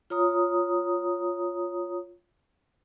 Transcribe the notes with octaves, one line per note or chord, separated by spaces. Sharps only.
F4 C#5 A#5 D#6